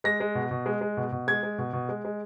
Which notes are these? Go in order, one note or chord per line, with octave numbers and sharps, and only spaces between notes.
G#3 A#6
G#3
B2
B2
G#3
G#3
B2
B2
G#3 G#6
G#3
B2
B2
G#3
G#3